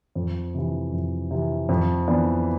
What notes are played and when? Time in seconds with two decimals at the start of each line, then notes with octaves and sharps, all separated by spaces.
0.15 F2
0.55 C3 E3
0.92 F2
1.31 C3 E3
1.69 F2
2.07 E3 B3 D4